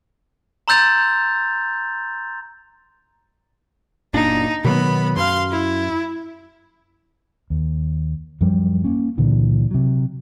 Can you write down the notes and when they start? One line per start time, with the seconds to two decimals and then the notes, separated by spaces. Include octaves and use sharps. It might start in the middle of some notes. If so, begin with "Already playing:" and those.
0.68 A#5 C6 E6 G6 A6 F7
4.14 F#1 A#2 D4 D#4
4.65 B2 D#3 F#3 B3 B5
5.16 F#2 F5 C6
5.51 E4
7.50 D#2
8.41 F#2 F3 G3
8.84 A#3 C#4
9.18 C#2 A#2 D3 E3
9.71 C3 F#3